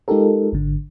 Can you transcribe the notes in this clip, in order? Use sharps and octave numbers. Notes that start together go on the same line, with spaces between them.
G#3 D#4 F4 G4 A4 A#4
G#1 D3